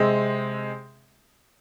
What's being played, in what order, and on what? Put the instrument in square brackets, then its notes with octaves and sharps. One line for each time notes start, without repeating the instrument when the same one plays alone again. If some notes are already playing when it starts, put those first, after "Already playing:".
Already playing: [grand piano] C3 G#3 C4